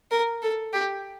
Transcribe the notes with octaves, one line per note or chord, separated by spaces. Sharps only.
A#4
A4
G4